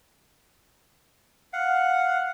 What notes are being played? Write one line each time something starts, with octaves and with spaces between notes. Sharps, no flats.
F5 F#5